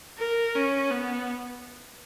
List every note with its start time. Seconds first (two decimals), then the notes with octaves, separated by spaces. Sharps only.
0.18 A#4
0.55 C#4
0.91 B3